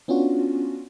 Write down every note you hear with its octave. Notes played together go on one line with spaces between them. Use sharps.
B3 C#4 D4 F4 F#4